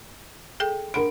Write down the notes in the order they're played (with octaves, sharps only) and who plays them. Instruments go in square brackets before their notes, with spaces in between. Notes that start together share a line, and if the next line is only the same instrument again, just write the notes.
[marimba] G#4 A4 G5
[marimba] D4 F#5 B5 [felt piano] A#4 D7